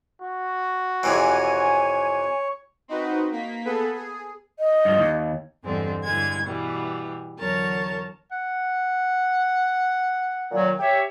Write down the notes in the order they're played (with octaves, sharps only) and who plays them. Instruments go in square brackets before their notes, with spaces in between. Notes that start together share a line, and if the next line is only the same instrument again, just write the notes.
[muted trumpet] F#4
[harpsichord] F2 C3 E3 [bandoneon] C#5 [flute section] G#5
[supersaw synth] C4 D#4 F#4 B4
A#3 B6
B3 G#4 A4 B4
G#4
[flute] D#5
[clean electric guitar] G2 F3
D#2
[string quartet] E2 G2 D3 G#3 C4
G2 D3 E3 G#3 G#6
B2 E3 G3
E2 D3 F#3 A#4 C#5 A5
[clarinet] F#5
[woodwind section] A#2 D#3 F#3
G4 C#5 E5